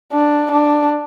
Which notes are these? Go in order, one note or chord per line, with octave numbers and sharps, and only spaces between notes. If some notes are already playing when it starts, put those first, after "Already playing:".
D4
D4